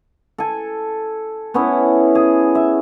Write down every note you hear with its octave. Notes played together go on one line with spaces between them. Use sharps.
A4 G#5
B3 C#4 E4
G#4
E5